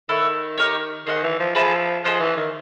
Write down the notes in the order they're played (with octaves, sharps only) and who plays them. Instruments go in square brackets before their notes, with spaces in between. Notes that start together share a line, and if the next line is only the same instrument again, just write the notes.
[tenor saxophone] D#3 [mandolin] E4 A4 C#5 F#5
[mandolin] D#4 G4 A#4 C#5
[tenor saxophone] D#3 [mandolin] G#4 C5 D#5 F#5
[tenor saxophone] E3
F3
[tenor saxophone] F3 [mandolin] G#4 B4 E5 A5
[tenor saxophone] F3 [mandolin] G#4 C5 D#5 F#5
[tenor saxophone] E3
D#3